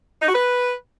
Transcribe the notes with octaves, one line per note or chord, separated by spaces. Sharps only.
D#4
F#4
B4